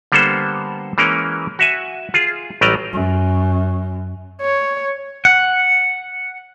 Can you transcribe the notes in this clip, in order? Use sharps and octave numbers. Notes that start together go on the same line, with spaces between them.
D3 G3 A#3 B3 A4 C5
E3 G#3 A#3 C#4 A#4
F#4 E5 G#5
F4 G#4
A1 F#3 G3 D5 D#5 A#5
F#2
C#5
F#5